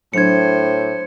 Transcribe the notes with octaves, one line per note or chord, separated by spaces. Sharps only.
A2 F#3 D4 C5 G#6 C#7